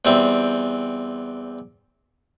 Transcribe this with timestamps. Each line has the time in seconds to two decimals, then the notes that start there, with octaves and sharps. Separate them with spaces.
0.05 E2 G3 C4 E5